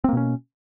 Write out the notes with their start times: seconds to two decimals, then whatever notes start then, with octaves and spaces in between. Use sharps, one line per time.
0.04 C4
0.09 A#3
0.13 B2
0.17 C#4